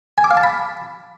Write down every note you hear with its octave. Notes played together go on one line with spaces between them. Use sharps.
G#5
D6
F5
A5
B5